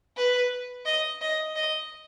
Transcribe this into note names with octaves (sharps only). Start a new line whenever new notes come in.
B4
D#5
D#5
D#5